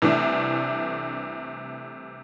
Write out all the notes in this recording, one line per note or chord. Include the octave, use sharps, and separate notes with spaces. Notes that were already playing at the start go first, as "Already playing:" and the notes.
C2 C3 E3 A3 D4